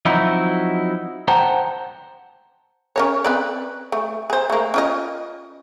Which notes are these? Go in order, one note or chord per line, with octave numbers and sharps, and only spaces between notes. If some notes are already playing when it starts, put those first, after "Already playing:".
F3 F#3 C4 D#4 E4 F#4
C5 F#5 G5 A5 A#5
C#4 A#4 C#5
C4 B4 D5
A3
G#4 C5
A3 A#3
C#4 F4 D#5